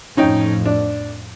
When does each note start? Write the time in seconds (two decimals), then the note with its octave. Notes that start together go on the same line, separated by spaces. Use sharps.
0.17 F2 A2 C#4 D#4 G5
0.66 D4